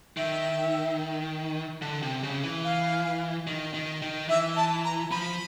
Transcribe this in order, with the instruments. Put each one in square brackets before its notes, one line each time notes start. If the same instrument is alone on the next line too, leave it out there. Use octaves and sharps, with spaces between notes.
[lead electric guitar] D#3 [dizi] E5
[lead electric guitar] D3
C3
C#3
E3
[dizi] F5
[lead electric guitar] D#3
D#3
D#3
[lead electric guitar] E3 [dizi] E5
[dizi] A5
A#5
[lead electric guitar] F3 [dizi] B5